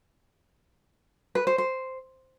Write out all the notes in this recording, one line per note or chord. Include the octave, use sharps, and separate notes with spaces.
B4
C5
C5